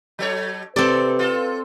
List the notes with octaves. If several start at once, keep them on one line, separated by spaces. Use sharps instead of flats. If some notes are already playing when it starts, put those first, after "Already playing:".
F#3 A4 C#5
C3 C4 A4 B4 D5
F4 A4